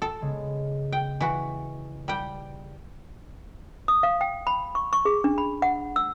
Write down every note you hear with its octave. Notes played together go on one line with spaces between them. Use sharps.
A4
C#3 G#3 B3
G5
E3 F#4
G3 G5
D#6
F5
G5
B5
C#6
C#6
G#4
D4
B5
F#5
E6